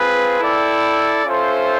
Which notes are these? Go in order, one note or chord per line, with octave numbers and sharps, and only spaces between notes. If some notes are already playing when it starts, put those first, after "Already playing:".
Already playing: C4 F4 G#4 B4
E4 A4 D5 G5
C#4 F4 A4 C5 E5